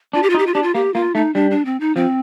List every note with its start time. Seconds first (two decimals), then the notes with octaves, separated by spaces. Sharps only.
0.13 D4 F4
0.23 G4
0.30 F4
0.34 D#4
0.39 G4
0.47 F4
0.54 D4 G4
0.63 F4
0.75 A#3 G4
0.94 A#3 F4
1.15 A3 D#4
1.35 G3 D4
1.51 D4
1.65 C4
1.80 D#4
1.96 F3 C4